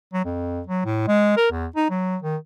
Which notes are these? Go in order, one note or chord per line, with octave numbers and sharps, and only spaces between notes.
F#3
F2
F#3
A2
G#3
A#4
E2
D#4
F#3
D#3